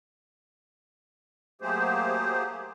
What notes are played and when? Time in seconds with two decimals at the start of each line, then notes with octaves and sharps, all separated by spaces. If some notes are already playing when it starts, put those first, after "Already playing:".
1.62 F#3 A3 A#3 G4 G#4 C5